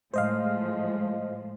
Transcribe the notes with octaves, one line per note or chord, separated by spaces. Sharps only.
A2 F3 G#3 C5 D#5 F5